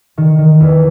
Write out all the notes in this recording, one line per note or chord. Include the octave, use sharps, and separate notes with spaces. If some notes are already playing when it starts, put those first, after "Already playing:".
D#3
D#3
E2